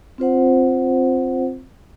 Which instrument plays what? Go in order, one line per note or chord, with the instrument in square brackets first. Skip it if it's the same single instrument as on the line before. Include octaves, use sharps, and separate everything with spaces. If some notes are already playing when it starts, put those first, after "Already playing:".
[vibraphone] C4 F4 C5 F#5